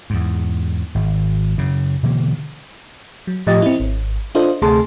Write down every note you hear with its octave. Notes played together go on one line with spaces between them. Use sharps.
E2 G#2
G#1
F#2 C#3
B2 D3 E3 A#3
F#3
A2 F3 G4 D#5 A6
C4 E4
G#1
D4 F4 A4 C5 D#5
D2 C3 A3 G#4 A5 C6